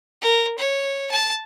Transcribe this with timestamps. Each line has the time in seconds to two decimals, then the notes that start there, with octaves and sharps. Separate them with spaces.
0.22 A#4
0.58 C#5
1.11 A5